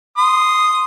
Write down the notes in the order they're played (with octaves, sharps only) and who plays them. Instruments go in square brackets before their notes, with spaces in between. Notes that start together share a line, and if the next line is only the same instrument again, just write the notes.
[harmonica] C6 D#6